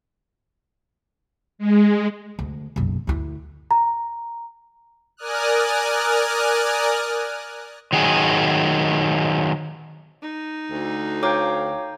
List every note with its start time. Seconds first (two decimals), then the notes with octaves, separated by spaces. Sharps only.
1.58 G#3
2.39 D2
2.76 F#1 B1
3.07 D2 E4
3.71 A#5
5.17 A#4 D5 G#5 D#6 F6 F#6
7.93 D#3 F#3 G#4
10.22 D#4
10.71 D2
11.23 C#5 F5 G5 A#5 D6